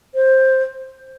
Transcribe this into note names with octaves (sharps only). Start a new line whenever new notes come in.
C5